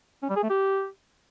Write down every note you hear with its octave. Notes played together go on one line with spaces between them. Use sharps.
C#4
G3
G#4
A3
G4